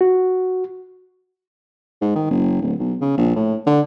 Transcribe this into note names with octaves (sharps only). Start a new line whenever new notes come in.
F#4
G#2
D#3
F#1
D1
B1
C#3
A#1
A2
D3